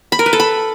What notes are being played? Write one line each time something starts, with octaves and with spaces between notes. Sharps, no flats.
B5
A#4
B4
A4
B5